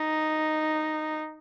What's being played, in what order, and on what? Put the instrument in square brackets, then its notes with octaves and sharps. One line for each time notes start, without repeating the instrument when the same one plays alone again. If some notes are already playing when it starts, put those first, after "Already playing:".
Already playing: [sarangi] D#4